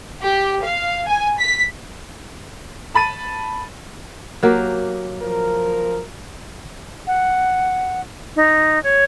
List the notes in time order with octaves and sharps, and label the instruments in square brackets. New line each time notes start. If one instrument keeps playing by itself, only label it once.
[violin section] G4
F5
G#5
B6
[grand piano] A5 B5 A6 D#7
[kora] F#3 A#3 G4
[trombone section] F3 A#4
[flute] F#5
D#4
C#5